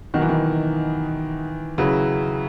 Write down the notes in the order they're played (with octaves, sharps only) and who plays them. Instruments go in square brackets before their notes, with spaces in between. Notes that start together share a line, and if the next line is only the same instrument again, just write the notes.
[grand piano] B2 F#3 A#3 D#4 F#4 [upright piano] D#3
[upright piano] E3
D#3
[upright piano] C#3 [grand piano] F#3 C#4 E4 B4